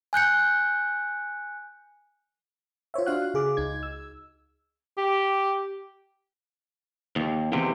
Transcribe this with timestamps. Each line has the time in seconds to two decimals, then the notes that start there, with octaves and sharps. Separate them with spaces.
0.13 G#5 F#6 G6 C#7
2.94 F4 C5 C#5 E5
3.06 D4 F#4 F5 F#6
3.34 C#3 G#4 D6
3.57 C#2 D#4 G#6
3.83 E6
4.98 G4
7.16 D#2
7.52 E2 C3